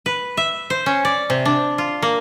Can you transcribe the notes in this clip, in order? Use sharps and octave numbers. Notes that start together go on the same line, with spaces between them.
B4
E5
C5
C#4
D5
C3
D4
F4
A#3